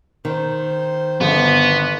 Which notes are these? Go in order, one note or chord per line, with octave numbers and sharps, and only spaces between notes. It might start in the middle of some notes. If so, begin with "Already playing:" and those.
D#3 C5
G1 B3